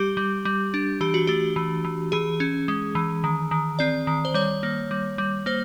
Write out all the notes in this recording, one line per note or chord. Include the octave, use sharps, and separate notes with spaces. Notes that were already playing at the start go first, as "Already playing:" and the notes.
Already playing: G3 G4
G3
G3
D4
E3 G4
F#4
A3 G4
E3
E3
E3 G#4
C#4
G#3
E3
D#3
D#3
C4 D5
D#3
C5
G3 C#5
A#3
G3
G3
A#3 C5